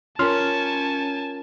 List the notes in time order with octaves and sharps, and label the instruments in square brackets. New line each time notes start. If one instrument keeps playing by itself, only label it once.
[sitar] C#4 [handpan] F4 A#4 [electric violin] G#5 A5 [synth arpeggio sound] C6 F6